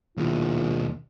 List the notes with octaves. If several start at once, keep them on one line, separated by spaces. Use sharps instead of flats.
A#1 D#2 B2 E4